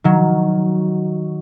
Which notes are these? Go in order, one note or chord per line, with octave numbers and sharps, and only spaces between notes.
D#3 F#3